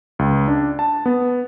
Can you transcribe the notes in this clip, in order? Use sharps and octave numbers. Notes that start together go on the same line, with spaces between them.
C#2
D4
A5
B3